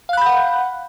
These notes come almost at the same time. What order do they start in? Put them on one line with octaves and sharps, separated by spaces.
F5 F#6 B5 G6 F#5